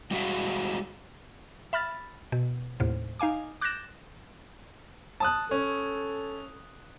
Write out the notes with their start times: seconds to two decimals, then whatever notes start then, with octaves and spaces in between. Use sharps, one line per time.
0.11 G3 G#3 F#4 E5 F5
1.73 E5 B5 F6 A6
2.32 B2
2.80 D#2 A2 C3
3.19 D#4 F5 G#5 D6
3.61 D6 F#6 G6 A6 A#6 E7
5.20 A5 D#6 F#6
5.51 C#4 A4